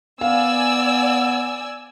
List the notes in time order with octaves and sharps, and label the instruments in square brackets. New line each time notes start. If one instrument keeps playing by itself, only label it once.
[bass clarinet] B3 [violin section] D5 G#5 E6 [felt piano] F5